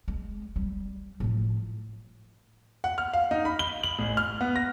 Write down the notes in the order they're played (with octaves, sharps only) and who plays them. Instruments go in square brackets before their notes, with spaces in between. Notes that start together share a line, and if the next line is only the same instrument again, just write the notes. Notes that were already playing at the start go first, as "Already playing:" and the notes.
[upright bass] G#3
G3
A2 F3
[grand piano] F#5
F6
F5
D#4
B5
G7
F#7
A1
F6
B3
A#6